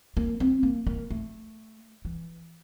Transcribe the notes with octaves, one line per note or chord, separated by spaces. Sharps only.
A#3
C4
A#3
A#3
A3
E3